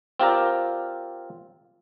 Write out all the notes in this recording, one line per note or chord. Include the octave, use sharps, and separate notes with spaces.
C4 F4 G4 A#4 D5